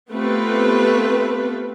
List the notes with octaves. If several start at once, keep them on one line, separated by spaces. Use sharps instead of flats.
A3 B3 C4 F4 G4 B4